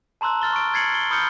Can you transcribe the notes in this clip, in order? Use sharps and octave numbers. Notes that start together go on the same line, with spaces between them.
A5 A#5 C6 E6 F#6
F6 A6 G7
C#6 D7
G#6 A6 C7 C#7 F#7
G7
B5 D#6 F6 G6 C#7 G7